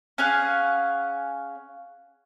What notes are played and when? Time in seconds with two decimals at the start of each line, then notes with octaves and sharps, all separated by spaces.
0.18 C#4 G#4 F5 F#5